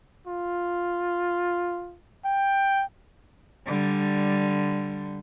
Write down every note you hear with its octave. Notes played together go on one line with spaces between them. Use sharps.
F4
G5
D3 G3